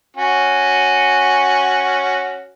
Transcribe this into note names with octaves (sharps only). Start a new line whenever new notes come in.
C#4 F#4